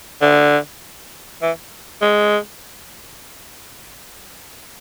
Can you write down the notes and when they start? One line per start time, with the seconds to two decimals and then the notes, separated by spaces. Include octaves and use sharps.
0.22 D3
1.42 E3
2.02 G#3